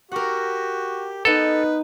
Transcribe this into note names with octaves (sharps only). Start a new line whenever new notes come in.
F#4 G4 A#4 F#5
B3 D#4 A4 B4